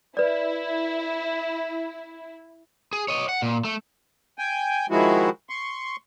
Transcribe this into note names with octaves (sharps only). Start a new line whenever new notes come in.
E4 B4 D5
G#4
C#5 D#5
F#5
A#2
A3
G5 G#5
D#3 F3 G#3 E4 F#4
C6 C#6